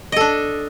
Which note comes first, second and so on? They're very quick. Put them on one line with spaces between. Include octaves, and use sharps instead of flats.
D#5 A4 D4